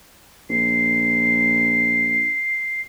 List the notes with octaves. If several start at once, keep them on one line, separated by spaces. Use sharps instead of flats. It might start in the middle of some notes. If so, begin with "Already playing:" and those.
A#1 C7